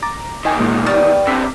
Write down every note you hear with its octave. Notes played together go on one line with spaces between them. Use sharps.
A#5 D6 A6
E2 D#3 D#5 G5 G#5
A#2 G#3 A#3
G3 B3 C#6 F6 A6
C3 D4 E6 B6